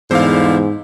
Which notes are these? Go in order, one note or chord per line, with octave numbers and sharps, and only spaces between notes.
E2 G#2 D3 G3 E4 C5 F5